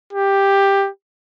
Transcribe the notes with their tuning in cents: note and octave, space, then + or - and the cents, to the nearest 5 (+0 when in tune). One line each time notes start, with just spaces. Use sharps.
G4 +10